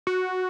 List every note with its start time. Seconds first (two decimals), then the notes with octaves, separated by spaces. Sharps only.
0.07 F#4